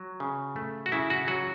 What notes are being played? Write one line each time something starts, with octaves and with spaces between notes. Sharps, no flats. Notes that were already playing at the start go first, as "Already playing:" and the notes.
Already playing: F#3
C#3
A3
F#4
C#3 E4
F#4
F#3 F#4